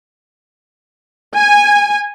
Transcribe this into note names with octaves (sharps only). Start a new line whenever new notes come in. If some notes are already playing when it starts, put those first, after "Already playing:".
G#5